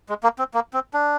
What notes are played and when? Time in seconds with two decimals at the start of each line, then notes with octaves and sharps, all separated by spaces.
0.09 G#3
0.23 A#3
0.39 C4
0.54 A#3
0.74 C4
0.94 D4